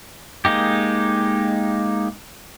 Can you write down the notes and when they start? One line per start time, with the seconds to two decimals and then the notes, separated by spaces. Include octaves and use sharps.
0.45 G#3 A#3 D#4 G4